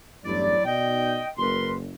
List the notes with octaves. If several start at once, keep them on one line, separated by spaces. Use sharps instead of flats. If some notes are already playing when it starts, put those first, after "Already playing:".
A1 E2 G2 F#3 E4 D5
B2 D#4 D5 D#5 G5
F#1 A#4 B4 C6